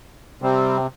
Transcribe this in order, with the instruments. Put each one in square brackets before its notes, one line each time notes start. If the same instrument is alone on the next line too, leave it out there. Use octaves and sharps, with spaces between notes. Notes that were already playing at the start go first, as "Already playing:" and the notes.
[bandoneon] C3 [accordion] G3 C4